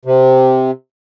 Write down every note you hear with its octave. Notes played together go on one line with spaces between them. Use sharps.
C3